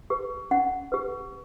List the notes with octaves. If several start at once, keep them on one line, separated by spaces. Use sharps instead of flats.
G4 B4
C#4 F#5
G4 B4